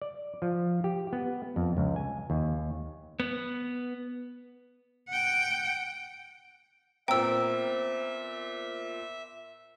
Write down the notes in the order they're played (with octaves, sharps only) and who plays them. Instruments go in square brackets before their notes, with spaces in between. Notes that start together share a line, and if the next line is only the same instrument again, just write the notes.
[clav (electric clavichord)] D5
F3
G4
B3
F2
C#2
G#5
D#2
[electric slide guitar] B3
[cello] F#5 G5
[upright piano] A#2 B3 C4 [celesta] C5 A#5 [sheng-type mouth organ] E5 [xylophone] G5 E6